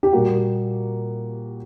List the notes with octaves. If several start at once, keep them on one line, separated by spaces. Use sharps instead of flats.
G4
A#2 G3 A#3 F#4